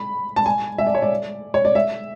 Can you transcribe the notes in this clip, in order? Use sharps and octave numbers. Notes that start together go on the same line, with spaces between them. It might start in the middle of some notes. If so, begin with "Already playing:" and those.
Already playing: B5
A5
G#5
E5
D5
C#5
D5
C#5
D5
E5